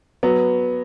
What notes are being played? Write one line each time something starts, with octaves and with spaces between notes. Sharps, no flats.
F#3 B3